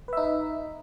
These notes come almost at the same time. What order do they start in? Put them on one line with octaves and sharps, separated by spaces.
B4 E5 D#4